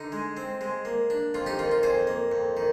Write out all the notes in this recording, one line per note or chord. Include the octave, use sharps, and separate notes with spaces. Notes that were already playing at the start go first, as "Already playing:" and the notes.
Already playing: D3 D#4
G#3
C4
G#3
A#3
D4
F2 F4
D#4 G4
D#3 F4
F4
F2 G#4 C5
A#3
F2
D#3